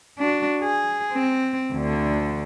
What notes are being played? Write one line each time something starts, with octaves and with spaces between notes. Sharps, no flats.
D4 F#4
G#4
C4
D2 D3